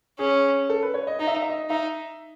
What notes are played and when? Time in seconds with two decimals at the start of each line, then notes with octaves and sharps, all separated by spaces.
0.19 C#4 G#4
0.70 A4
0.82 B4
0.94 C#5
1.07 D#5
1.19 D#4 D#5
1.27 E5
1.35 D#5
1.43 E5
1.49 D#5
1.70 D#4 E5